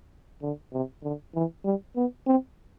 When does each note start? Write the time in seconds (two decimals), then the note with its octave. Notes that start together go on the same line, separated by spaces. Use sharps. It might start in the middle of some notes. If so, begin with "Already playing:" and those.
0.42 D3
0.73 C3
1.03 D3
1.35 E3
1.64 G3
1.96 B3
2.27 C4